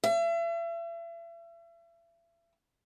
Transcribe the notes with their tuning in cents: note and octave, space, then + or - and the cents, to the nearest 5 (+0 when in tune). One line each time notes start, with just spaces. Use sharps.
E5 +40